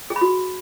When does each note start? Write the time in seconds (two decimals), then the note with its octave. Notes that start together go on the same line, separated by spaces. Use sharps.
0.10 G#4
0.16 B5
0.21 F#4